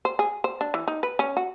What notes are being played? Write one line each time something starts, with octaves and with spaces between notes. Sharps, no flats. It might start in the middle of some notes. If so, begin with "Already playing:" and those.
C5
G#4
C5
D4
E3
D#4
B4
C#4
F#4